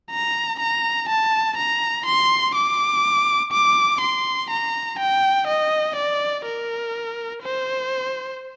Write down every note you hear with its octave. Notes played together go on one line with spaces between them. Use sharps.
A#5
A#5
A5
A#5
C6
D6
D6
C6
A#5
G5
D#5
D5
A#4
C5